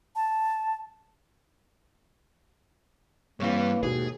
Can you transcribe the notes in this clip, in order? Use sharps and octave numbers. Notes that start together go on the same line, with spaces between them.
A5
G2 E3 G3 A#3 C4 C#5
D#2 G#2 B2 G#4